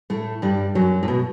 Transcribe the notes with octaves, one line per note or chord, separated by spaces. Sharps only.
A2 A3
G2 G3
F#2 F#3
A2
B2